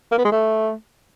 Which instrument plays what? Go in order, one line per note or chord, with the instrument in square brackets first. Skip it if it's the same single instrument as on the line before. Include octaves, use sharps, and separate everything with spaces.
[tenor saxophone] A#3
B3
G#3
A3